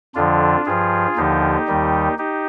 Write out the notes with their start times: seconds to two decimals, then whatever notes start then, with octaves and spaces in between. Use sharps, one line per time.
0.15 F2 D3 F3 D4 F4
0.66 G2 F3 F4 G#4
1.17 D#2 D3 F3 D#4 G4
1.68 D#2 D#3 G3
2.18 D#4 G4